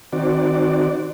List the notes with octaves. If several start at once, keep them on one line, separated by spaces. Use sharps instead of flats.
D#3 C4 F#4 D5